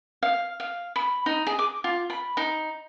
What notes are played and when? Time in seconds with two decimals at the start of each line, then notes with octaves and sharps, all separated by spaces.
0.23 F5
0.60 F5
0.96 B5
1.26 D#4
1.47 G#4
1.59 D6
1.84 F4
2.10 B5
2.37 D#4